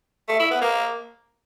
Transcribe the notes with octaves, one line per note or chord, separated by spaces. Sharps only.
A3
E4
B3
A#3